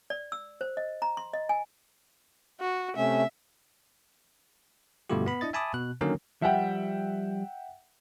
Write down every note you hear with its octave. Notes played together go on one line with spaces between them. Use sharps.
D5
E6
C5
D#5
A#5
C6
D#5
G#5
F#4
C3 A3 C#4 E5
G2 B2 D3 A3 F4 G4
B3 B5
D4 E4 D#5 A6
E5 G#5 A5 B5 D6 D#6
B2 F#6
D3 D#3 F#3 A#3 C#4 A#4
F3 G3 E5 F#5 G5